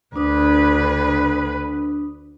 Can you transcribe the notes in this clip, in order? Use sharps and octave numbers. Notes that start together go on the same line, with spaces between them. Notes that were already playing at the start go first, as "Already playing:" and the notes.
D2 D4 B4 D#6